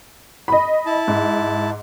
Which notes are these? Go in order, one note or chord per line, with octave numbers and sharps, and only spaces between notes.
D#5 B5
E4 A5
G#2